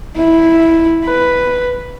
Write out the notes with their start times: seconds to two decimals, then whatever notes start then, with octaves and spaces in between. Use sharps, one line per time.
0.17 E4
1.05 B4